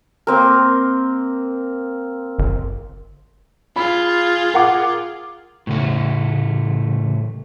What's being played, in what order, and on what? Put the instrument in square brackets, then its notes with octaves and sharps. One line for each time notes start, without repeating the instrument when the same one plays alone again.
[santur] A#3 C4 A#4
[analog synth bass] G1
[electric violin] F4 G#4 [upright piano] B5
[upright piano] A#4 F#5 D6
[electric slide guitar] A2 C#3 A3